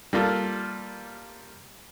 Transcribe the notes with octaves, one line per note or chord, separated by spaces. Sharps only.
G3 A#3 F4 A4